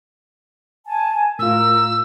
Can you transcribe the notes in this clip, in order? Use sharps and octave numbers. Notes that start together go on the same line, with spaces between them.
G#5 A5
A2 F4 A#4 E6